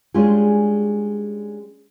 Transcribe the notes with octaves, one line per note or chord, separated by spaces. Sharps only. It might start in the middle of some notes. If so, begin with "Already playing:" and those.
G3 G#3 C#4 D4 F4 G#4